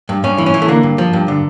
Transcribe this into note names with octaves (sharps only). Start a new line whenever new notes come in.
G2
G2 C#4
E3
C#4
E3
A3
D3 A#3
G2
F3
G2
D3